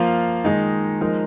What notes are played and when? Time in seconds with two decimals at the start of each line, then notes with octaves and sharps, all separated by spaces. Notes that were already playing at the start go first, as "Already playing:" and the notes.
Already playing: F3 A#3 F4
0.44 D#3 G#3 D#4
1.01 F3 G#3 D#4 A#4